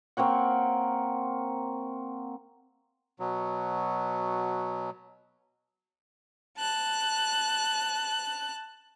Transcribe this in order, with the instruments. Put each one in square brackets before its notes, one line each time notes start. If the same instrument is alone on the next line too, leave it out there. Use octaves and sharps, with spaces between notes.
[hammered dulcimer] A#3 C4 C#5 F#5
[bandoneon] B2 F#3
[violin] A5 F#6